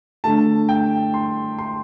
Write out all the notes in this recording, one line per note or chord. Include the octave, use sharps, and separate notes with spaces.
D3 A3 D4 A5
G5
C6
C6